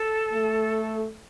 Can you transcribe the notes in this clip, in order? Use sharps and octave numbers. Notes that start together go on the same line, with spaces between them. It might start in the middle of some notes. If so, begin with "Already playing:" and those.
Already playing: A4
A3